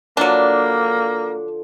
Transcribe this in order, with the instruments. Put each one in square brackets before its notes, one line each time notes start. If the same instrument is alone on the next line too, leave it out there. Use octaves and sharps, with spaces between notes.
[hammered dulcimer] D3 F3 [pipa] F#3 D4 [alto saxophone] A#3 [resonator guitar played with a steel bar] B4 D5